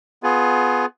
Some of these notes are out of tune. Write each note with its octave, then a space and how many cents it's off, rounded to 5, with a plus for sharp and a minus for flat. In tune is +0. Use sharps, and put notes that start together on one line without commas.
B3 +15 F4 +15 G#4 +25